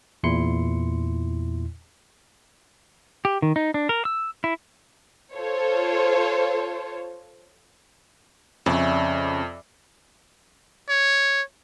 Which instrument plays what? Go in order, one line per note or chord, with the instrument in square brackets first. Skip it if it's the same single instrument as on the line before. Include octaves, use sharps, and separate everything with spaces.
[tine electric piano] E2 A#2 E4 C6 C#7
[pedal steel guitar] G4
D#3
D#4
D4
A#4
E6
E4
[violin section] F4 A4 C5 C#5
[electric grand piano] F2 [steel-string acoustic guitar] C#3 [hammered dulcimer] D5 E5
[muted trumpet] C#5